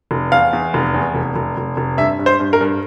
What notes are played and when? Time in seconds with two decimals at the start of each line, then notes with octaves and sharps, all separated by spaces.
0.11 F1
0.32 E2 F5
0.53 E2
0.74 F1
0.94 E2
1.15 F1
1.36 F1
1.57 F1
1.77 F1
1.98 G2 E5
2.19 G2
2.26 C5
2.40 G2
2.53 A#4
2.61 G2